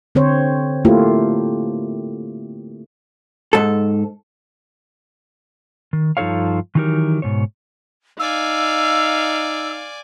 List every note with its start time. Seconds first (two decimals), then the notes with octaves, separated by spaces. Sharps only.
0.15 D3 C4 C5 C#5
0.85 A3 A#3 E4 F4 G4
3.53 G#2 A4
5.93 D#3
6.17 G2 F3 D#4 A4 C#5 F5
6.75 D#3 E3 F#3 D#4 G4 A#4
7.22 G#2 B2 C#5
8.20 D#4 D5 F5 G#5 E6